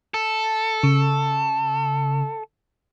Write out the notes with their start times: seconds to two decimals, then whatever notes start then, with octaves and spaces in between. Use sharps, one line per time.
0.14 A4
0.83 C#3